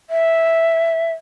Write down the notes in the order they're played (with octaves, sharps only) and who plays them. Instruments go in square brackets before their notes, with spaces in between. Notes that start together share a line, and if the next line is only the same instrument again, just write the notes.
[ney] E5